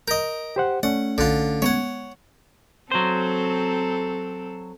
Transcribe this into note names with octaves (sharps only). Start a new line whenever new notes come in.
A#4 D#5 G6 A#6
G4 C5 F#5
A3 C#4 D5 F#5
B1 D3 F4 F#6
G#3 B3 C#5 F#5 G#6
F#3 C4 A4 C5